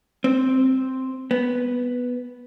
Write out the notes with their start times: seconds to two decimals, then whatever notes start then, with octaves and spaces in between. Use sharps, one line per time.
0.24 C4
1.31 B3